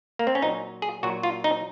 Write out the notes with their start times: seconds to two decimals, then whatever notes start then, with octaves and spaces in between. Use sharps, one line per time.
0.19 A#3
0.27 C4
0.35 C#4
0.42 A#2 F#3 D#4
0.82 G#4
1.03 A#2 F#3 F#4
1.23 F4
1.44 D#4